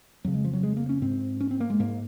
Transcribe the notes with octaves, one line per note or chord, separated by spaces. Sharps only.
F2 C#3 F#3
G#3
F3
F#3
G#3
A#3
C#4
G#2 C4
C#4
C4
A#3
G#3
G#2 A#3